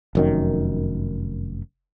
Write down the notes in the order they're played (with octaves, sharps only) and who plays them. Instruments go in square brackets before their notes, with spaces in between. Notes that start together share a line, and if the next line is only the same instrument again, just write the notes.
[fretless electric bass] F1 F#2 D#3